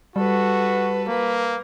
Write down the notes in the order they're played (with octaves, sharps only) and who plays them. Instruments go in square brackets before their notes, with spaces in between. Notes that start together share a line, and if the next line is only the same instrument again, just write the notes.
[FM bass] G3 [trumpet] F#4 [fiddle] A4 B4
[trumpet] A#3 [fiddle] B4